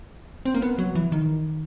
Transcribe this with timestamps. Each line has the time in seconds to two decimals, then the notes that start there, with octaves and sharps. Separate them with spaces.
0.45 C4
0.55 A#3
0.62 B3
0.78 F#3
0.95 E3
1.12 D#3